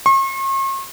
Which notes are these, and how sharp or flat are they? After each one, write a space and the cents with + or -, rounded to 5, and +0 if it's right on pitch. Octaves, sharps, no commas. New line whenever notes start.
C#6 -45